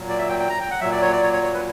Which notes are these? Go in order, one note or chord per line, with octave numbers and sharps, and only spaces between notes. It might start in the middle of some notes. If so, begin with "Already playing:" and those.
Already playing: A#2 F#3
D5
E5
G5
G5
A#5
G5
F#5
A#2 F#3 E5
D5
C#5
D5
C#5
C#5
C#5
B4